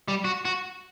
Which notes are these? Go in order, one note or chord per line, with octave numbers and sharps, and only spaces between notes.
G3
F#4
F#4